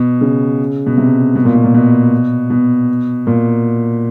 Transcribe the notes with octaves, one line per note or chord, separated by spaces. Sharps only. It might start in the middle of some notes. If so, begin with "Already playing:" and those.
Already playing: B2
C#3
B2
C3
B2
A#2
B2
A#2
B2
B2
A#2